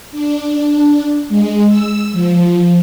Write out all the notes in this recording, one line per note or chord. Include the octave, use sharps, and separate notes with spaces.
D4
G#3
E6
F3